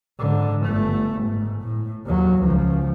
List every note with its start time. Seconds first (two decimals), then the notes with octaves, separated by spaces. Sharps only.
0.19 G#2 D3
0.66 G1 A3
1.22 G#2
1.62 A2
2.05 D#2 F#3
2.42 C#2 F3